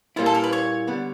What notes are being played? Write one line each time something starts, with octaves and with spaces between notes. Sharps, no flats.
A#2 G3 A#3 C#4 E4 F4
A4
A#4
B4
C#5
D3 G3 B3